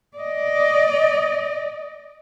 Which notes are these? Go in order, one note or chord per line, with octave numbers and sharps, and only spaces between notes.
D5 D#5